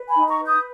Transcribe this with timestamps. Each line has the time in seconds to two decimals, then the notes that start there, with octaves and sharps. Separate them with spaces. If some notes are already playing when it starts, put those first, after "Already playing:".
Already playing: B4
0.09 G#5 B5
0.16 D#4
0.27 A#5 C#6
0.40 B4
0.46 D#6 G6